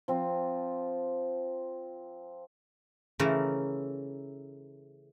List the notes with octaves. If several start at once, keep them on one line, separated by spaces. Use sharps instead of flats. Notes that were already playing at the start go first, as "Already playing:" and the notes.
F3 C4
C#3 E3 A3 A#4